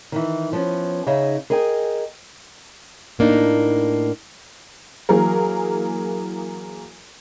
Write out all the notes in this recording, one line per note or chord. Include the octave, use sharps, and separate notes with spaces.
D#3 E3
F3 B3 C#4
C#3 D#4 G#4 E5
G#4 A#4 D#5 G5 G#5
A2 A#3 D4 D#4
E3 F#3 A#3 G#4 A#4